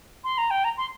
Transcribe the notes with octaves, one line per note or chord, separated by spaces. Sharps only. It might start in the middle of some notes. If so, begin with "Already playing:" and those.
C6
A#5
G5
A#5
C6